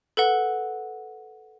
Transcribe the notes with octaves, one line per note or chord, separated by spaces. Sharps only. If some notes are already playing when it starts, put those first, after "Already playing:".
A4 B4 F#5